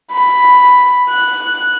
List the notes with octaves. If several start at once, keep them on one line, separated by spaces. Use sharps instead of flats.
B5
F#6